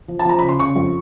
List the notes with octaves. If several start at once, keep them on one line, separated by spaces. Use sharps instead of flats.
F3
A5
F3 A#5
C#3 B5
C6
C#3 C#6
F2